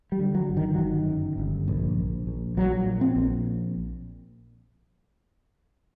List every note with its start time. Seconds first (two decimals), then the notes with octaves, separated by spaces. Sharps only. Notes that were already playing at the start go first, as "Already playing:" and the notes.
0.12 G3
0.19 D3
0.35 F#3
0.50 G1
0.57 D#3
0.75 F#3
0.78 G1 D#3
1.09 F#2
1.38 G1
1.68 A#1
1.98 A#1
2.27 A#1
2.57 A#1 F#3
2.86 A#2
3.01 C4
3.16 A#1